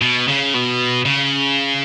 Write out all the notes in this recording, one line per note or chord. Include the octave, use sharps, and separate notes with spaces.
B2
C#3
B2
C#3